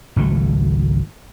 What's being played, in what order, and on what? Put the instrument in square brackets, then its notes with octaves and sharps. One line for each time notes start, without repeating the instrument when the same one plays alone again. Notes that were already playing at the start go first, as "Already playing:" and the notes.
[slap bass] G#1 C#2 F#3 A3